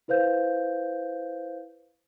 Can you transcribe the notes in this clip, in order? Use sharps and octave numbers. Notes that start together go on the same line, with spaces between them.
E4 B4 C5 F5 G6